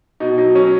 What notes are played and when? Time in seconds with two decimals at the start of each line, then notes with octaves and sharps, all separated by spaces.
0.20 B2 D#4
0.38 F#3 D#4
0.55 F#3 C#4